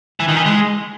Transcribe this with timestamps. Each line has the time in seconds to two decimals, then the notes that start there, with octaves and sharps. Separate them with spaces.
0.20 E3
0.28 D#3
0.37 E3
0.46 G#3